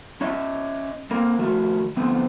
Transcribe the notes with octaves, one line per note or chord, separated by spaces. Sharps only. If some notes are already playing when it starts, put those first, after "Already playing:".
C#4 C#5 D#5 E5
A#3 C4 A#4
D#3 F3 A3 F#4 A#4
D3 F3 A3 B3 C4 B4